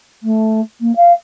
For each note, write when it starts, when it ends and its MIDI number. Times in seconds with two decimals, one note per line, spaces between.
0.23 0.60 57
0.80 0.95 58
0.96 1.12 77